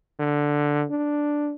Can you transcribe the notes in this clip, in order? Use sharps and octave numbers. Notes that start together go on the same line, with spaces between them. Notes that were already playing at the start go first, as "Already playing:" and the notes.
D3
D4